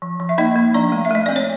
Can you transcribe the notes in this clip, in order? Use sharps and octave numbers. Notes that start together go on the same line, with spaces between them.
F3
F3
E5
A#3 D#4 D#5
A#3
F3 D4 D5
A3
E5
A3 D#5
C4 D5
C#5